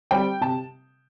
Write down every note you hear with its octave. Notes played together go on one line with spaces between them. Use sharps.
G3 C4 G5
C3 A5